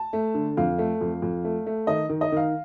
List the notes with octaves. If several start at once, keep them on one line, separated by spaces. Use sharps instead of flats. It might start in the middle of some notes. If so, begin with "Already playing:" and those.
Already playing: A5
A3
D3
F2 F5
A3
F2
F2
A3
A3
D#3 D#5
D#3
D#5
D#3 F5